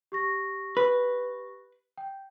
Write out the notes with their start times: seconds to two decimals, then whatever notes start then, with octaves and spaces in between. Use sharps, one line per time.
0.12 G4 C#6 A#6
0.77 B4
1.98 G5